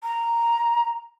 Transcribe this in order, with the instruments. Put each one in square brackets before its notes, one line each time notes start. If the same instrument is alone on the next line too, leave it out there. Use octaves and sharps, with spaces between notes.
[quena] A#5